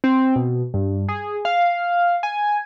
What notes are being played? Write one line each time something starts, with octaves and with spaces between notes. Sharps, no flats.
C4
B2
G2
G#4
F5
G#5